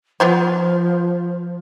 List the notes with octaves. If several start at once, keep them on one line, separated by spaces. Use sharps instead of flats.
F3 B3 F4 C5